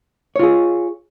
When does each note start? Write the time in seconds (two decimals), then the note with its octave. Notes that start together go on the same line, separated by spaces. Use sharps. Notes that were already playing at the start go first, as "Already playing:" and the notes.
0.36 C#5
0.39 F4
0.43 G#4